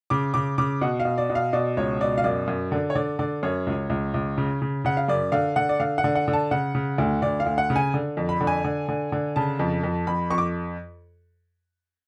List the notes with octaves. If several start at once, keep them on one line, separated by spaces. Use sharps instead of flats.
C#3 D6
C#3 D6
C#3 D6
B2 F#5
F5
B2
D5
B2
F5
B2 D5
C#2 C#5
B2 D5
F5
F#2 D5
F#2
D3
C#5
D3 D5
D3 D5
F#2 C#5
C#2
C#2
C#2
C#3
C#3
C#3 F#5
F5
F#2 D5
D3 F5
D3 F#5
D5
D3 F5
F#5
D3
F#5
D3
A5
C#3 F#5
C#3
D2
D2 D5
F5
D2
F#5
C#3
G#5
D3
F2
B5
D3
G#5
D3
D3
D3
C#3 A5
F2
F2
F2 B5
F2 C#6
D6